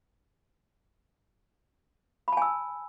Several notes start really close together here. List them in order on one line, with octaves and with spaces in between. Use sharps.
B5 A5 G#5 E6